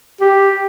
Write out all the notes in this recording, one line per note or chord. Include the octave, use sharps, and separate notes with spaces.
G4